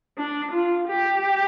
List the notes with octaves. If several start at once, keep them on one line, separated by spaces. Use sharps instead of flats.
D4
F4
G4